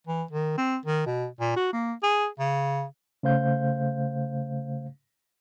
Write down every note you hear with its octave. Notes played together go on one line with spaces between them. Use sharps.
E3
D#3
C4
D#3
B2
A#2
F#4
A#3
G#4
C#3
C#3 A3 C5 F5 G6